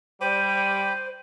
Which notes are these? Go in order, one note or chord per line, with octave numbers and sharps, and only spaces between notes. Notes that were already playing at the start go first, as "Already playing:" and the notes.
G3 C5 G5 B5 D6 D#7